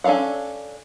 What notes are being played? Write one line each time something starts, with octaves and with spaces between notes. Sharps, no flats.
C#4 D4 A4 F5 F#5